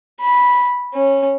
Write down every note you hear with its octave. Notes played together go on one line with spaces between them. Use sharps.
B5
C#4